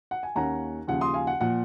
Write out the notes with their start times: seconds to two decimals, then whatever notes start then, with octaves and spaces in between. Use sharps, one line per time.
0.11 F#5
0.23 G#5
0.35 D#2 D#3 A#3 C#4 F#5 A#5
0.87 D#2 C#3 F3 F#5
1.01 C6 D#6
1.14 F5 G#5
1.27 F#5
1.40 A#2 F3 F#5